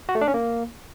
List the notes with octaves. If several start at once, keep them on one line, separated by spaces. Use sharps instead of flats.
F#4
A3
D4
C#4
A#3